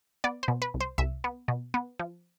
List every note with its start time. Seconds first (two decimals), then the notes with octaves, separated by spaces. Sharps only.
0.24 B3 D5
0.43 C5
0.48 B2
0.62 B4
0.74 C2
0.80 C5
0.98 C2 E5
1.24 B3
1.48 B2
1.74 B3
1.99 F3